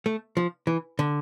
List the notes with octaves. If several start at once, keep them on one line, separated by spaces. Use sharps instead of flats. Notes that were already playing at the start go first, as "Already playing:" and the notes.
A3
F3
E3
D3